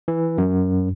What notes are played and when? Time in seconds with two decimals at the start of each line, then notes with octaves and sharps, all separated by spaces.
0.08 E3
0.38 F#2